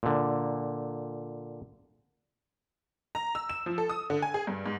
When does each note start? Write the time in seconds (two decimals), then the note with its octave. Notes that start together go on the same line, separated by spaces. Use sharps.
0.03 A#2 D3
3.15 A#5
3.35 E6
3.49 E7
3.66 F3
3.78 A4
3.90 D#6
4.10 D3
4.22 G#5
4.34 G#4
4.47 G2
4.66 G#2